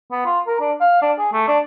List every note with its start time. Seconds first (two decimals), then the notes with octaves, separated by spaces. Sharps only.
0.12 B3
0.25 F4
0.47 A#4
0.60 D4
0.81 F5
1.02 D4
1.18 G#4
1.33 A3
1.48 D4